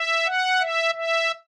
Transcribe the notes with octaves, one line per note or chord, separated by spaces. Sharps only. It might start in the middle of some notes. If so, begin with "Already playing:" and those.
Already playing: E5
F#5
E5
E5